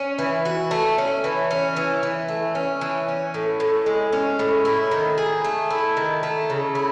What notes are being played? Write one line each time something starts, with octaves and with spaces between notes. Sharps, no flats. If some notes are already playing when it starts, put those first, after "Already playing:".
Already playing: C#4
E3
F#4
A3
C#4
E3
C#4
E3
E3
A3
C#4
E3
C#4
A2
A2
G#3
C#4
A2
E4
D#3
G#4
A3
E4
D#3
A3
C#3
E4